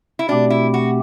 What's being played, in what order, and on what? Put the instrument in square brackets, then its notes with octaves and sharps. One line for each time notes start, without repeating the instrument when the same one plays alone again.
[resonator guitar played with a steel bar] E4
[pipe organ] B2 A3 C4 G4 [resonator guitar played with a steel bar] D4
[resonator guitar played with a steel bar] E4
F#4